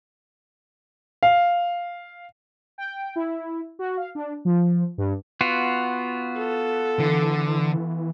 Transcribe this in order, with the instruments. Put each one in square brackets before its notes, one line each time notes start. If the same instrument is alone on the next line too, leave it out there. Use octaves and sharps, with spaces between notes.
[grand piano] F5
[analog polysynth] G5
E4
F#4
F5
D4
F3
G2
[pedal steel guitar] B3 F4 F#4
[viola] A4
[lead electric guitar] D3 [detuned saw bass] E3